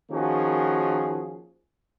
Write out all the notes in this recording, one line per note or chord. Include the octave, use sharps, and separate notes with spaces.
D#3 F3 A#3 C#4 F#4 G#4